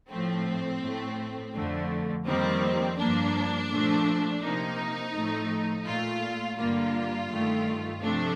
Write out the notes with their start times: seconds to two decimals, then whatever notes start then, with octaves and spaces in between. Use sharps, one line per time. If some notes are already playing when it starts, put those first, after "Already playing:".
0.10 A2 F3 A3 C4
0.82 A2 A3
1.54 F2 D3 A3
2.26 F2 D#3 G3 A#3 C4
2.98 G2 F3 A#3 D4
3.71 A#2 F3 A3
4.42 C3 F3 A#3 D#4
5.14 A2 F3 A3
5.86 A#2 A3 F4
6.58 G2 D3 G3 A#3 F4
7.30 G2 D#3 A3
8.02 C3 F3 A3 D4